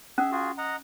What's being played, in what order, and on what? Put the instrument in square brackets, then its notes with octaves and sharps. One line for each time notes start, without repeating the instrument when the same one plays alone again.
[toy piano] C#4 [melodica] G#4 E5
[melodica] F4 F#4 G#4
D#5 F#5 A#5